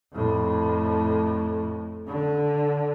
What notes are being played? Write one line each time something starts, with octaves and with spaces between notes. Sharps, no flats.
F2 A2
D3